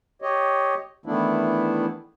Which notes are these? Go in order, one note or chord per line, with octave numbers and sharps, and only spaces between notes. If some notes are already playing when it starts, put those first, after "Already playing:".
G4 C#5 D#5
D#3 E3 A3 B3 D4 E4